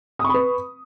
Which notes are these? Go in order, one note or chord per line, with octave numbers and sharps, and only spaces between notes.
B4 B5 C#6 D#6